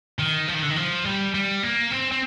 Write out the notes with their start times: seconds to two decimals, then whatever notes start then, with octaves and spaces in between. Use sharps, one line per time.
0.19 D#3
0.48 F3
0.54 D#3
0.62 D3
0.69 D#3
0.76 F3
1.05 G3
1.34 G3
1.63 A#3
1.91 C4
2.12 C4